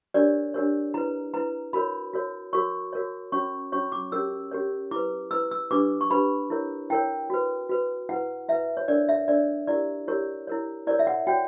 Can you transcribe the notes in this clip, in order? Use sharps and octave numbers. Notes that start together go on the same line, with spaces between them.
D4 G4 A#4 C#5 D5
D4 G4 A#4 C#5
E4 B4 A#5
E4 B4 A#5
F#4 A#4 C#5 B5
F#4 A#4 C#5
F#4 A#4 C#5 C#6
F#4 A#4 C#5
C#4 F#4 C#5 C#6
C#4 F#4 C#5 C#6
D6
C#4 G4 A#4 C#5 E6
C#4 G4 A#4 C#5
E4 B4 D6
E4 B4 E6
E6
D4 G4 B4 D6
C#6
D4 G4 B4 B5
E4 A#4 C#5
E4 A#4 C#5 G5
F#4 B4
F#4 B4
E4 B4 F#5
E4 B4 E5
C#5
D4 A#4 C#5 D5
E5
D4 A#4 C#5 D5
E4 G4 A#4 D5
E4 G4 A#4 C#5
E4 A#4 C#5
E4 A#4 C#5 D5
E5
F#5
F#4 C#5 G5